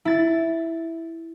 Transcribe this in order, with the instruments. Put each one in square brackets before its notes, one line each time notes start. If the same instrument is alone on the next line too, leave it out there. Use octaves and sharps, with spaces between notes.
[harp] E4 A6